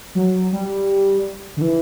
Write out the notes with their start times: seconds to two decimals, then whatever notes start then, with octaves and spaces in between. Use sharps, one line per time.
0.15 F#3
0.52 G3
1.57 D3
1.61 E3